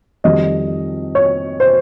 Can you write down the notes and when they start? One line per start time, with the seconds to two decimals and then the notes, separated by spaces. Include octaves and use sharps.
0.24 F2 D#3 G3 D#5
1.15 C#5
1.60 C5